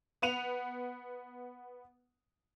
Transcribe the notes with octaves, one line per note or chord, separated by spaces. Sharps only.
B3 F#5 D#7 F7